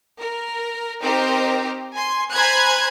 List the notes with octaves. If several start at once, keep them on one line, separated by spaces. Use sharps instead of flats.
A#4
C4 D#4 G4 A#4 C5 G5
G#5 C6
C5 G#5 A#5 B5 F#6 G#6